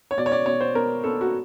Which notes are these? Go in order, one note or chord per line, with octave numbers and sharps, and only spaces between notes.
C#5
B2 D5
C#5
D5
B2 C#5
C5
B3 A#4
B3 A4
F#4